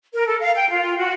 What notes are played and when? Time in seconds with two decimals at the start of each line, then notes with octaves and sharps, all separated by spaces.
0.13 A#4
0.26 A4
0.40 F5
0.55 G5
0.69 F4
0.98 F#4